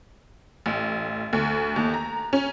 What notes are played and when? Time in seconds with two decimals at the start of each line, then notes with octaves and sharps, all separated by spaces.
0.66 A1
1.33 D2
1.76 D#2
1.94 A#5
2.33 C#4